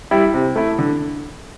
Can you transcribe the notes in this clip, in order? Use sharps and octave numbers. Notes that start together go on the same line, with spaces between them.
G3 E4
C3
A3 E4
D3